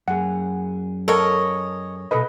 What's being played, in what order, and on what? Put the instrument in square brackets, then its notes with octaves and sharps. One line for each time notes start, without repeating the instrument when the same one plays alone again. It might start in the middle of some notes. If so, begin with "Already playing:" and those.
[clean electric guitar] F#2 G#4 [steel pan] F#5
[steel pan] A4 A#4 A#5 [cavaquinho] C#5 D#5
[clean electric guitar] B2 A4 B5 [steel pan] B4 D#5